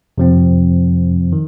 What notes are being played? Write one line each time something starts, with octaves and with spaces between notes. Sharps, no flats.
F2 C3 F3 C4
D#3